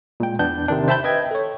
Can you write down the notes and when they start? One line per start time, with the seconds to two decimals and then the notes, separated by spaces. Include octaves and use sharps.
0.20 A#2 G#3 G5
0.39 E2 B3 D4 G6
0.68 C3 D#3 D4
0.88 C5 E5 G5 A5 B5 G6
1.04 B4 D#5 E5 G5 G#6
1.31 A4 C#5